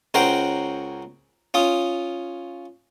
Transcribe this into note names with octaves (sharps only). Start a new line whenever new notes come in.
C#2 C#4 F#4 A#4 C5 G5
C#4 F4 D#6